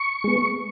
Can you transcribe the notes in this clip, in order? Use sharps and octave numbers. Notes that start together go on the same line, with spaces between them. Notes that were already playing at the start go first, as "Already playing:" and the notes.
Already playing: C#6
G#3 B3